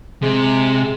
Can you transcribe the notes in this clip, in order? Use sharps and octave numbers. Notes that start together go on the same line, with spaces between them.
C3 G#3